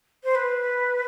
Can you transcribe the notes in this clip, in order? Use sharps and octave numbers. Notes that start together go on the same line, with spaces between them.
C5
B4